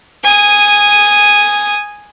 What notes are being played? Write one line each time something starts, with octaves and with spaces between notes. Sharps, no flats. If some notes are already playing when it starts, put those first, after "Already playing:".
G#5 D#6